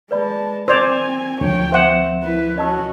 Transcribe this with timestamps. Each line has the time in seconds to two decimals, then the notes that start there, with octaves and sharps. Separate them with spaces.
0.11 G#3 B4 D5 A5 B5
0.68 C4 C5 D5 G#5 E6 G#6 F7
1.41 D2 F3 C#5 G5
1.72 C4 C5 E5 F#5 E7
2.24 E4 B4
2.58 C#4 F#4 D#5 A5 E6